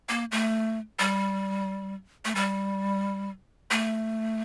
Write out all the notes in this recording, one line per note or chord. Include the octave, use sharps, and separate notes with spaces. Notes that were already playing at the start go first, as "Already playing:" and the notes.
A#3
A3
G3
A3
G3
A3